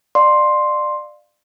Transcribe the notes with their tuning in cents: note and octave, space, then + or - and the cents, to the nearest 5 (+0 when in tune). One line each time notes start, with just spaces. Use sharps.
D5 +25 F5 +0 C6 +5